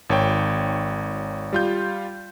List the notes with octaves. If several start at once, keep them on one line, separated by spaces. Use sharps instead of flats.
G#1 C#5 G5
G3 F4 G6